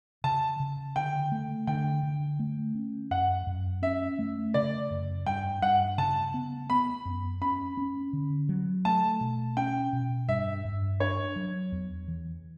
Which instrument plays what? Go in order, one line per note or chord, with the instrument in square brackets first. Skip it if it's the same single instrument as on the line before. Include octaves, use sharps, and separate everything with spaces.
[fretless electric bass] C#3 [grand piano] A5
[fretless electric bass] C#3
[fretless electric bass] D3 [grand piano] G5
[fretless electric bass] A3
[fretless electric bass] D3 [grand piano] G5
[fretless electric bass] D3
A3
C#4
[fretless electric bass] F#2 [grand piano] F#5
[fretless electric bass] F#2
[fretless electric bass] C#4 [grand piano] E5
[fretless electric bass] A3
[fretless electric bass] C#3 [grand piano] D5
[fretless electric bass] F#2
[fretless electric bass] G2 [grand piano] G5
[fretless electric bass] G2 [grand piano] F#5
[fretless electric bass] C#3 [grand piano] A5
[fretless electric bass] B3
[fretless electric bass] B3 [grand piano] B5
[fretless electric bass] F#2
[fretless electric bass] C#4 [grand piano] B5
[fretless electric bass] C#4
D3
F#3
[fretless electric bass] A3 [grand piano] A5
[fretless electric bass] B2
[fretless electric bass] C#4 [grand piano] G5
[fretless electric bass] B2
[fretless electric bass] G2 [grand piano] E5
[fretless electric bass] G2
[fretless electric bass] D4 [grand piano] C#5
[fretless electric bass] F#3
E2
E3